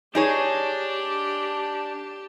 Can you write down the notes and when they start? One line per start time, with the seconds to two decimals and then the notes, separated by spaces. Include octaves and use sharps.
0.15 D4 D#4 G4 G#4 C#5 A5